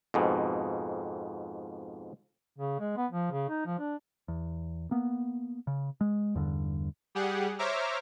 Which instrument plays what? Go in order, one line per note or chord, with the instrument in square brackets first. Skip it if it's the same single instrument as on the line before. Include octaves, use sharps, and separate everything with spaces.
[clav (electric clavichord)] F2 G#2 B2
[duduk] C#3
G#3
B3
F3
C#3
D#4
F3
D4
[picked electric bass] E2
A#3 B3
C#3
G#3
E2 G2 D3
[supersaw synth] G3 G4 G#4 F#5
C5 C#5 E5 A#5 D6 F6